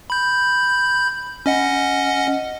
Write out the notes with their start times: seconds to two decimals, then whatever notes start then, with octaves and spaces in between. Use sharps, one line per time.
0.10 B5 G6
1.46 C#4 D#5 F#5